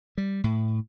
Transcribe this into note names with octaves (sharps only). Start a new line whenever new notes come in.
G3
A2